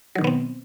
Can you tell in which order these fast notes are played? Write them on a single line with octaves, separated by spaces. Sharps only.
F#3 D#3 B2 B3 C4